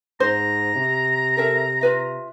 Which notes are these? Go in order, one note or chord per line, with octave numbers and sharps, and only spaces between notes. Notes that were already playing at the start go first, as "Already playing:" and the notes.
G#2 C5 A#5
C3
A4 A#4 E5
F4 B4 E5